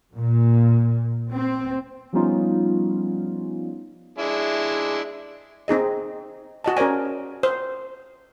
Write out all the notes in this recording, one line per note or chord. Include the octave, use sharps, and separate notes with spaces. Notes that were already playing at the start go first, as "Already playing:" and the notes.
A#2
C4
F3 G3 B3 C#4 D#4 F4
G#3 D4 E4
C4 D#4 G#4 D#5
F#4 D#5 A5
C#4 A#4 C5 D5 G#5
C5